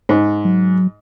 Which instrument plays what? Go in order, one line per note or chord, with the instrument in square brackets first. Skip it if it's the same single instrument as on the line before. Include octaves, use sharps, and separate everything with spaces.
[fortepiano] G#2
[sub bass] F#3